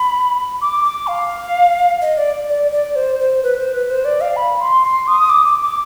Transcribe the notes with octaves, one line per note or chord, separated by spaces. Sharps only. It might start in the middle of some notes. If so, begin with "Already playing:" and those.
Already playing: B5
D6
D6
F5
D#5
D5
D5
D5
C5
C5
B4
C5
B4
C5
D5
F5
B5
C6
C6
D#6
D6
D6
D6